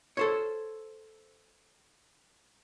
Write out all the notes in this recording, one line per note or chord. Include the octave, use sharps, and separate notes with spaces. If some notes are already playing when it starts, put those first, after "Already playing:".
A4 C5 C#5